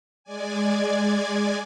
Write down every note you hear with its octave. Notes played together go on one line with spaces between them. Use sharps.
G#3 D5 G#5